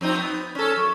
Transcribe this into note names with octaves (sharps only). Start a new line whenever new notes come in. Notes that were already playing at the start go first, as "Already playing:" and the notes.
F2 C4 D#4
B3
C#4 A4
F#2